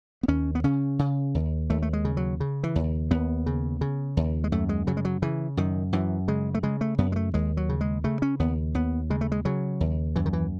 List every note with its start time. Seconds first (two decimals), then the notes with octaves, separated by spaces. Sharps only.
0.23 B3
0.28 D#2 C#4
0.55 B3
0.64 C#3 C#4
0.99 C#3
1.35 D#2
1.70 D#2 A3
1.82 A3
1.93 G#3
2.05 C#3
2.17 F#3
2.40 C#3
2.63 E3
2.76 D#2
3.11 D#2 B3
3.46 C#3
3.81 C#3
4.17 D#2
4.44 G#3
4.52 F#2 A3
4.69 G#3
4.87 C#3 F#3
4.97 G#3
5.05 F#3
5.22 C#3 E3
5.57 F#2 D#3
5.93 F#2 E3
6.28 C#3 G#3
6.54 A3
6.63 C#3 G#3
6.81 A3
6.98 F#2 B3
7.12 G#3
7.16 A3
7.34 D#2 G#3
7.57 F#3
7.69 C#3
7.81 G#3
8.04 C#3 A3
8.22 C#4
8.40 D#2 B3
8.75 D#2 B3
9.10 C#3 G#3
9.21 A3
9.32 G#3
9.45 C#3 F#3
9.81 D#2
10.16 F#2 E3
10.26 D#3
10.33 E3